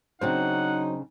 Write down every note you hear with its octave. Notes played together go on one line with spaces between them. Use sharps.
C#3 F#3 C4 D4 D#4 C5 F#5